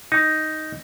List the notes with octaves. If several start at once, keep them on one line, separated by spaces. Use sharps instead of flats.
D#4